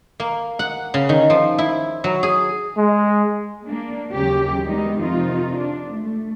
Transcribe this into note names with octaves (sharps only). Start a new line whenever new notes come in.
A#3
F#5
C#3
D#3
F3
E4
F#3
G#4
G#3
A#3 D4
D#2 C#3 F#3 C#4 G4
D#3 G3 G#3 B3 D#4
F2 C3 D#3 D#4 F4
D4
A3